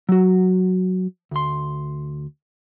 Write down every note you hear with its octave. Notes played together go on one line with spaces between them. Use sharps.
F#3 F#4
D2 C6